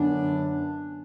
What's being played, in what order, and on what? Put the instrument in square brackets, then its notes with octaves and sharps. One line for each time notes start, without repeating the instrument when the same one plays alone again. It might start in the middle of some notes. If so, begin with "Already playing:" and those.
Already playing: [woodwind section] F#2 D3 F#3 B3 D4